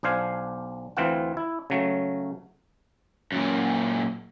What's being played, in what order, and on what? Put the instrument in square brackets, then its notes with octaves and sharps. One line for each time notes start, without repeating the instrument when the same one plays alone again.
[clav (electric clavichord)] B1 D4 C5 F5 G#5
D2 E3 C4 F4 F#5
E4
C#3 F#3 A3
[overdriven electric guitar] F#2 A#2